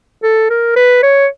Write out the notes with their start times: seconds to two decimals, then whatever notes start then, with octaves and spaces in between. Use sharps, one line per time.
0.23 A4
0.50 A#4
0.76 B4
1.03 C#5